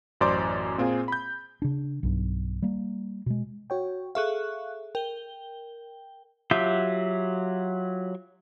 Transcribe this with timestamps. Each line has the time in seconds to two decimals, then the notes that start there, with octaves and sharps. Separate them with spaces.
0.21 A1 F#2 C5 D5 C6 D6
0.78 A#2 C4 F4 G#4
1.08 B5 G6
1.62 C#3 D4
2.03 B1 G2
2.63 G3 A#3
3.26 B2 G#3
3.70 F#4 C#5 G5
4.15 G#4 A4 E5 F5 C#6 F#6
4.95 A#4 G5 G7
6.51 F#3 F4 G4 E5 G6